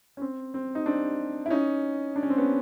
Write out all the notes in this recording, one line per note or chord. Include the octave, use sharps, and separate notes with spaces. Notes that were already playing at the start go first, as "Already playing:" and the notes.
C#4
C4
C4
D#4
C4 D4
E4
C#4 D#4
D4
C#4
C4
B3 C#4